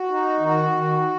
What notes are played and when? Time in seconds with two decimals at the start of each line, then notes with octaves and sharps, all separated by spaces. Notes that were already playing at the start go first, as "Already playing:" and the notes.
Already playing: F#4
0.11 D#4
0.40 D#3 F#4
0.70 D#3